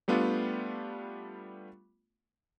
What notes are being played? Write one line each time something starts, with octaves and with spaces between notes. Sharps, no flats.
G3 A3 B3 D4 F4